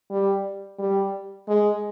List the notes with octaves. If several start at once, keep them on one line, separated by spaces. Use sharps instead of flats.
G3
G3
G#3